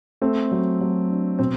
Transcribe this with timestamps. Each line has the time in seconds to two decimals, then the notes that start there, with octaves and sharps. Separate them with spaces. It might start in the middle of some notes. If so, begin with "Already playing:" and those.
0.21 A3 C4
0.52 F#3
0.81 F#3
1.10 D4
1.39 B2 C4